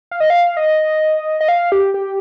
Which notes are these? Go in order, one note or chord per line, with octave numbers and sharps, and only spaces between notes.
F5
D#5
F5
D#5
D#5
F5
G4
G4